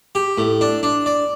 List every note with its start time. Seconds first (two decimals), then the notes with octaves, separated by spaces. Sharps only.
0.15 G4
0.38 A2
0.61 D4
0.83 D4
1.06 D5